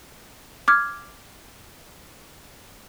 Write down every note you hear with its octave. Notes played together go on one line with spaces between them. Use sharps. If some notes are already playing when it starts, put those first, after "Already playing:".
D6 F6 G#6